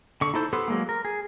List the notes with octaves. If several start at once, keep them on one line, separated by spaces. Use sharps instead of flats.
D3 C#6
D#4 E4 A4 C5
B3 G4 A4 B4 C5
F#3 G#3 A#3
A#4
G#4